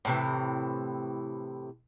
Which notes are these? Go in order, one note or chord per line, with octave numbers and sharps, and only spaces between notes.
A2 C3 E3